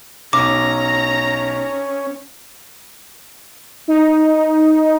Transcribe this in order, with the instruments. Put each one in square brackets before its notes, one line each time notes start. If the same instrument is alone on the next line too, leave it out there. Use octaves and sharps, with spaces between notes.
[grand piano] B1 [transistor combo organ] C#4 [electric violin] A#5 [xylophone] D6
[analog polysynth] D#4